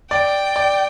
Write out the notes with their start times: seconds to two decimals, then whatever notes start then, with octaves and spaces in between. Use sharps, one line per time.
0.11 D5 G5
0.56 D5